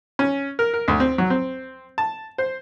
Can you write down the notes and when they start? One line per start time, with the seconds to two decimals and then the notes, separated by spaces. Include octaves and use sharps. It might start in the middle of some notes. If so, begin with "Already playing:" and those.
0.19 C#4
0.59 A#4
0.74 A#4
0.88 D2
1.00 C4
1.18 F#3
1.30 C4
1.98 A5
2.38 C5